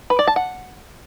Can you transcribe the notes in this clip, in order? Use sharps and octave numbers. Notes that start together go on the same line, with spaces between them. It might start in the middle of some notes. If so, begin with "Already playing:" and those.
B4
D5
A5
F#5